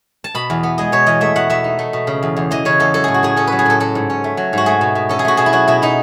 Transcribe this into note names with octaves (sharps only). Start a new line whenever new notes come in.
A5
B2 B5
E2
B3
G#3 D#5
B2 C#5
E2 D#5
A3 E5
B2 F#5
B2 E5
D#4
A3
B2
C#3
E2
E2
E3 D#5
C#3 C#5
E2 A4
F#3 A4
A2 G#4
F#4
A2 G#4
C#4 A4
F#3 B4
G#4
A2 A4
F#3 A4
G#2
C#4
A3
F#3
G#2 F#4
A3 G#4
B2
B2
C#4 A4
G#4
A3 F#4
B2 G#4
E4
F#3 F#4
B2 E4
B2 D#4